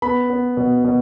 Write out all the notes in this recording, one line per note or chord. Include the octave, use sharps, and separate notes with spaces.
B3 B5
B3
B2
B2